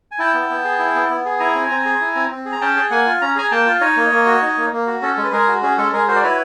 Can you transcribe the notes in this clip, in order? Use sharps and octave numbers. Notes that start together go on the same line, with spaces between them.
G#5
E4 G5 A5
B3
B3
G#4
E4
B3
B3
G#4
E4 G#5 A#5
C4
C4
G#4
E4
C4
C4
G#4
A#5
C#4 G5 A5
G#4
A#3 F#5 G#5
F4
C#4 A#5
G#4 G#5 A#5
A#3 G5 A5
F4
D#4 C#5 D#5
A#3
A#3
F#4
D#4
A#3
A#3
F#4
C#4 A4
G#3
B4
G#3 G#4 A#4
F#4
C#4 G#4
G#3 A4
G#3 G#4 A#4
F#4 A#4 C5
D5
E4 B4 C#5